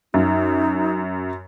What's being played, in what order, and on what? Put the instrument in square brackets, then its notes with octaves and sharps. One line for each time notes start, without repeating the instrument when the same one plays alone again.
[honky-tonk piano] F#2 [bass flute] D#4